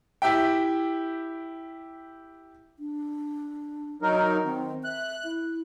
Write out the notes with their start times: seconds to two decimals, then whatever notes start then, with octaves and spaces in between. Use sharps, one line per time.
0.22 E4 G4 E5 G5
2.79 D4
4.02 F#3 D#4 A#4
4.45 D#3 C4
4.84 E5 F#6
5.24 E4